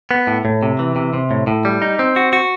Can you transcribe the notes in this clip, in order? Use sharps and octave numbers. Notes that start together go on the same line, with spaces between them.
B3
A2
A2
C3
E3
C3
C3
A2
A2
G3
D#4
C4
F#4
F#4